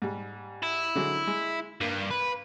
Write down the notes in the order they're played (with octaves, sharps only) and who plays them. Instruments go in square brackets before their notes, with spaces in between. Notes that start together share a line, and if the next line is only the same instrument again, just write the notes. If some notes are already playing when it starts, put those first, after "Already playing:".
[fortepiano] G#2 G3
[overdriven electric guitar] E4
[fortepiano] D3 F#3 G#3
G#3
[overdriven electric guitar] G2 [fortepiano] A#3
[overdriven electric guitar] B4